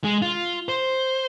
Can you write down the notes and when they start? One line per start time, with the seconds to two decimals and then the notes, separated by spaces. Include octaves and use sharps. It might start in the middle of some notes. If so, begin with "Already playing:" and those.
0.04 G#3
0.22 F4
0.69 C5